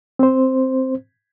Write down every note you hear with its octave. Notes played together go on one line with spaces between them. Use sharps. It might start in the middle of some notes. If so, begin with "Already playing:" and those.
C4 C5